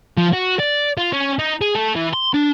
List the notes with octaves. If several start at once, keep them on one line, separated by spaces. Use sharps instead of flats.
F3
F#4
D5
F4
C#4
D#4
G#4
A3
E3
C6
D4